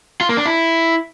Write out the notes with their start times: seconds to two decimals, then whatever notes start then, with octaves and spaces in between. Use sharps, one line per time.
0.21 F4
0.29 A#3
0.37 D4
0.46 E4